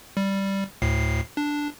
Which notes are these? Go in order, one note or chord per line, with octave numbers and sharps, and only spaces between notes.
G3
D2 A2 C7
D4